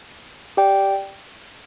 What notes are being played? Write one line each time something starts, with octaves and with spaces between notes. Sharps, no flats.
G4 D5 G5